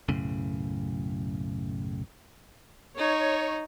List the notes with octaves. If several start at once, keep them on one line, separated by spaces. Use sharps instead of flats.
B1 F#2 A2 C#3
D#4 C#5